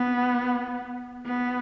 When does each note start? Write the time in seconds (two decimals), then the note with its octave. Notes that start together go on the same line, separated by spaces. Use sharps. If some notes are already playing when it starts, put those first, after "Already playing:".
Already playing: B3
1.26 B3